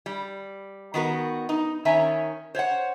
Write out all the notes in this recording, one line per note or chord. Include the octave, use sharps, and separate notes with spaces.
G3
D#3 B3 F#4 A#4
D#4
D#3 C#4 E5 G#5 A#5
C5 C#5 F5 F#5